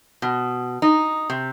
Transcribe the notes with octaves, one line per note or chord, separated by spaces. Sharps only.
B2
D#4
C3